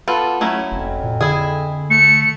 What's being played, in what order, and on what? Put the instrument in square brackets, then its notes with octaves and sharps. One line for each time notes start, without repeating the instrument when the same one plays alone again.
[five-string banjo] B3 F4 A4
[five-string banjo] F#3 C#4 E4 [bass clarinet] A3
[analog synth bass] F#1 [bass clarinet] F2
[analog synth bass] A#2
[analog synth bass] D3 [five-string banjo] E4 G#4
[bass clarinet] A3 [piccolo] C#7